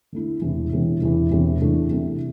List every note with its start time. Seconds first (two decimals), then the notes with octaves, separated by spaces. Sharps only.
0.12 D3 A3 E4
0.42 E1 E2 C3 E3
0.72 E1 E2 C3 E3
1.01 E1 E2 C3 E3
1.31 E1 E2 C3 E3
1.61 E2 C3 A3 D4
1.91 E2 C3 A3 D4